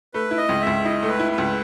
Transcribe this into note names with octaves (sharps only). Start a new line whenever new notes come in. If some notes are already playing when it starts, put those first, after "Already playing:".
A3 B4
E4
D#5
C#2
C#2 E5
E4 D#5
A3
B4
E4
B4
C#2